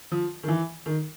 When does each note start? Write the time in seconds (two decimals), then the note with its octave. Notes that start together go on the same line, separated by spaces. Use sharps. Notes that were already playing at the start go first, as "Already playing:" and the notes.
0.11 F3
0.43 D#3
0.48 E3
0.86 D#3